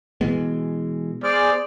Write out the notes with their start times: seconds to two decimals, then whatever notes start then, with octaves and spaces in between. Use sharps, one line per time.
0.21 B2 E3 G#3 B3
1.23 G#4 C5 D5 F6